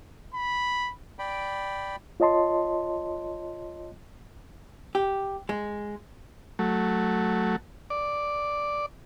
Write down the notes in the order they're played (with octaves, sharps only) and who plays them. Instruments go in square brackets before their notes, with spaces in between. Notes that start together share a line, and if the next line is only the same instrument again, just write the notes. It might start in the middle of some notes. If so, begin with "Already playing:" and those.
[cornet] B5
[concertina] D5 G5 B5
[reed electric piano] F4 C#5 D#5 A5 C6
[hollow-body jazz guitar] G4
G#3
[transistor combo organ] F#3 A3
D5